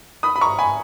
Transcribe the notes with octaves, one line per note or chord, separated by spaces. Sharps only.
B5 D#6
B5
A#5 C#6
G#5 B5